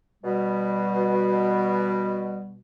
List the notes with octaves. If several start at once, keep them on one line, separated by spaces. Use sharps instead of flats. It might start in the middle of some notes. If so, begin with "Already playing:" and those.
B2 G3